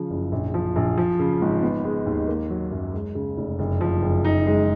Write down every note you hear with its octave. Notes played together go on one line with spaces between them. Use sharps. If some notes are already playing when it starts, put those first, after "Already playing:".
Already playing: C#3 F3
F#1
A#1
F3
A#1
F3
C#3
G#1
B3
G#3
D#2
A#3
F#3
F#2
G#3
C#3
F1
F#1
F3
F#1
D#4
G#3